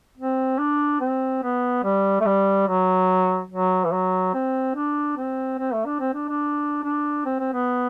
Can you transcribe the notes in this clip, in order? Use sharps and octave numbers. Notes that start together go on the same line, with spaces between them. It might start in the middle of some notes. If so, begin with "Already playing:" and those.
C4
D4
C4
B3
G3
A3
G3
F#3
F#3
E3
F#3
C4
D4
C4
C4
A3
D4
C4
D4
D4
D4
C4
C4
B3